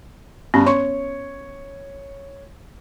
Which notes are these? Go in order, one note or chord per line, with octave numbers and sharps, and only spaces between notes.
G2 B3 C#4
C#5 C6 C#6